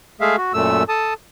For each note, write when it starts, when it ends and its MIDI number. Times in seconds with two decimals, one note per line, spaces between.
0.21 0.36 56
0.21 0.36 57
0.21 0.36 68
0.21 0.36 76
0.21 0.36 77
0.37 0.53 66
0.54 0.83 42
0.54 0.83 46
0.54 0.83 57
0.54 0.83 88
0.89 1.14 69
0.89 1.14 81
0.89 1.14 87